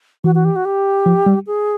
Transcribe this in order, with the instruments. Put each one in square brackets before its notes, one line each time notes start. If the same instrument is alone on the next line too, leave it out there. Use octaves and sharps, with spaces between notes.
[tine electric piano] E3 [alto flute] F#4
[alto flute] F#4
G4
F#4
G4
[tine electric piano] F3
G3
[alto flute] G#4